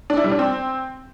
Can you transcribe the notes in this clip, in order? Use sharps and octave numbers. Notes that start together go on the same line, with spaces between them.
D4
E4
G3
D4
C4